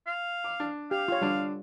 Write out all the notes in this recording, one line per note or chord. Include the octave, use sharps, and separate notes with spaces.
F5
D6
D4
G4 F5
F4 C#5
D3 G3 D4